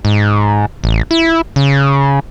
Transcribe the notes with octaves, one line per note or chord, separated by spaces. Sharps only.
G#2
A1
E4
C#3